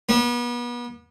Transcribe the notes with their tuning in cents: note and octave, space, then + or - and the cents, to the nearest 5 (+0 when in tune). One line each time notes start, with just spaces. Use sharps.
B3 -35